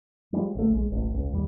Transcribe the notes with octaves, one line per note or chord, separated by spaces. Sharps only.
F3 G3 G#3
A1 D2 A3
A#1 G#3
D#1 A1
C#2
D#2 G3